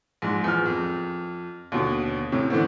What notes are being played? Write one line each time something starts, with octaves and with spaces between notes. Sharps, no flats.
A#1 G#2
E2 F3 F6
F2
D#2 B2 D3
A2 C3 C#4
D3 E3 A3 B3 C4